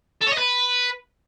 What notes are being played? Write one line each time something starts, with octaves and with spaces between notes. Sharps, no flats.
A4
C#5
D#5
B4